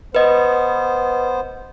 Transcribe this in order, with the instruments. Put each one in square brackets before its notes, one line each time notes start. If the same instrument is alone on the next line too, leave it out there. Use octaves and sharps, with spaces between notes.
[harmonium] B3 C5 [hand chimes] B4 D#5